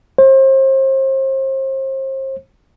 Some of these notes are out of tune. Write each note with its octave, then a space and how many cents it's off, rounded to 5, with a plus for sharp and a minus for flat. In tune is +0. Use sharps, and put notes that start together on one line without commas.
C5 +35